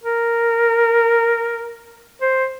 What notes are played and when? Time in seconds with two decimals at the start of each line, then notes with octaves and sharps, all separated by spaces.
0.04 A#4
2.21 C5